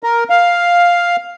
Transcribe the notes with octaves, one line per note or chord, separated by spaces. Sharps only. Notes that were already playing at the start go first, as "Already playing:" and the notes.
A#4
F5